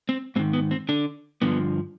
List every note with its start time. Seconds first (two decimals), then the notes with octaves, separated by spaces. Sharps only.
0.09 C4
0.36 G#2 C4
0.39 D#3
0.53 B3
0.71 C4
0.89 D3 D4
1.42 G2 D3 F3 B3